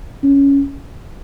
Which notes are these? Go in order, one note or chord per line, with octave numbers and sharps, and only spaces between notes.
C#4